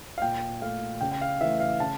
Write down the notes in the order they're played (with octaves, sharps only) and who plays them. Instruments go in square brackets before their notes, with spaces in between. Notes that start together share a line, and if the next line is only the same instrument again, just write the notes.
[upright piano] F5
A#2 G5
A3 F5
C#3 G5
G5
F5
E3 A3 E5
F5
C#3 A5